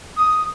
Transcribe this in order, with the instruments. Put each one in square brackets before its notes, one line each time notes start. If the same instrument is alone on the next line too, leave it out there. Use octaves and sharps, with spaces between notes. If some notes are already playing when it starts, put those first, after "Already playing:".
[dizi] D#6